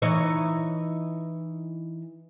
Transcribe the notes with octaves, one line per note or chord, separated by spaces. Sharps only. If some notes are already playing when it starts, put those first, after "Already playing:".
E3 D#4 C#5